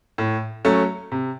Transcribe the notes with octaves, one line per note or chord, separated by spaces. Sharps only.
A2
F#3 A3 C#4
C3